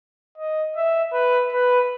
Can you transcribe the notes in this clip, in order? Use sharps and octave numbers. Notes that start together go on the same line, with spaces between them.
D#5
E5
B4
B4